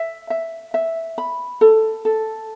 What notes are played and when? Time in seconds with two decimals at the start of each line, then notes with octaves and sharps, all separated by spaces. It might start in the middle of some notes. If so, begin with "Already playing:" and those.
Already playing: E5
0.30 E5
0.74 E5
1.18 B5
1.61 A4
2.05 A4